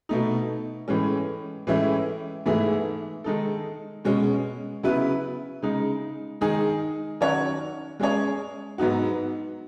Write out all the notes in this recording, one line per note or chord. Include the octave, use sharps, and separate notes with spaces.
B2 A3 D#4
A2 E3 G#3 C#4
A2 E3 G#3 C#4 E4
G#2 E3 A3 E4 G#4
D#3 G#3 D#4 A4
B2 G#3 C#4
C#3 F#3 B3 E4 B4
C#3 G#3 D#4
D#3 G#3 D#4 G#4
D#3 F#3 C#4 F#4 C#5
G#3 C#4 G#4 C#5
G#2 F#3 B3 D#4 F#4